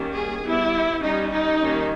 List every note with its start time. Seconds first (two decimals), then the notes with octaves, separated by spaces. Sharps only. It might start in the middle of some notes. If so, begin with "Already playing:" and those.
Already playing: D#3 G3 A#3 C#4
0.15 G#4
0.44 G3 B3 E4
1.02 G3 C#4 D#4
1.31 D#4
1.59 D#3 G3 A#3 C#4